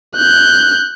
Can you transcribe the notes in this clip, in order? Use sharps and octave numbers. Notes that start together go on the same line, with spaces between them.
F#6 G6